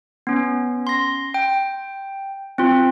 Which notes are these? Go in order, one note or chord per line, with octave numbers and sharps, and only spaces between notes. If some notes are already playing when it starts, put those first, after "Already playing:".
B3 C#4
C6 A#6
G5
C4 F4